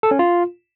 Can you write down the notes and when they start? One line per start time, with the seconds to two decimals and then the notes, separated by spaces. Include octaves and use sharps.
0.03 A4
0.11 C#4
0.19 F4